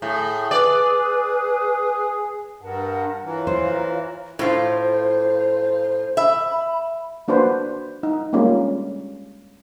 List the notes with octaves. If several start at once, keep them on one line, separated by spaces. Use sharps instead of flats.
A2 G#4
B4 D5
G2 A#4 F#5 A5
E3 F4 C#5 A#5
C5
A2 F4 C5
E5 B5
A#3 D4 F#4 B4 C5
D#4
G3 G#3 A#3 C#4 D4 F4